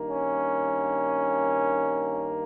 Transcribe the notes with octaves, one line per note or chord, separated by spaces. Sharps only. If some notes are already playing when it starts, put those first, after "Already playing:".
Already playing: G2 D#3 A#3
C#4